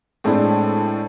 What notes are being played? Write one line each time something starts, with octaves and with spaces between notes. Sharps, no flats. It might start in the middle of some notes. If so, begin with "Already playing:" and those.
A2 G#3 A3 C4 D4 E4